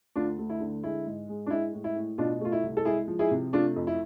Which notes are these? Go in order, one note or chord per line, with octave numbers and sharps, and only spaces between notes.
D2 D4 F4
D2
E4
D3
G#3 E4
G#2
G#3
D4
G#3 E4
A2
E4
A2
B2 D4 F4
A3 F4
E4
C2
A4
G#3 E4 G#4
F3
E4 G#4
C3
A3 D4 F4
F2
E4